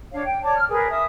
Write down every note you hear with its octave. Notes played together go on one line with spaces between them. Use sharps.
D4 C#5 F5
G5
C#5 D5 A5 D6
F6
G#4 A#4 B4 C#5
E5 D#6